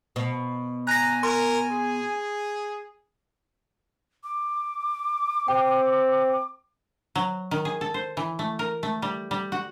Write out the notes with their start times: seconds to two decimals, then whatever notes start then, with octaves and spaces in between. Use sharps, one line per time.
0.16 B2
0.87 G#5 A#5 F#6 A#6
1.23 A#4 C6
1.72 G#4
4.24 D6
5.48 C4 G5
7.15 F#3
7.51 D#3
7.65 G#4
7.81 A4
7.94 C5
8.17 E3
8.39 A3
8.59 A#4
8.83 A3
9.02 G3
9.31 G3
9.52 F#4